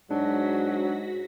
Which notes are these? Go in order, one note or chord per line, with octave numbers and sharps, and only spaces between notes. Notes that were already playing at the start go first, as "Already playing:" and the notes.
G#2 F#3 D4 F#4 A#6 B6